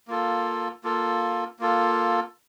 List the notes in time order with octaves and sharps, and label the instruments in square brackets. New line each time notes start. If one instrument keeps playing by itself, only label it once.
[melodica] A#3 F4 A4
A#3 F4 A4
A#3 F4 A4